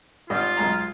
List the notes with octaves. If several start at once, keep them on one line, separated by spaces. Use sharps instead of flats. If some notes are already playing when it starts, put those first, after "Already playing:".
G#1 G3 F4 D#5
B1 G#3 A#5